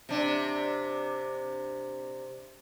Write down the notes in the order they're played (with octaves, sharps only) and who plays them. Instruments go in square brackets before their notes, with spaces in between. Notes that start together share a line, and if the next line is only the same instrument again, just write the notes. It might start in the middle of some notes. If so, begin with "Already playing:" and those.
[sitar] C3 D4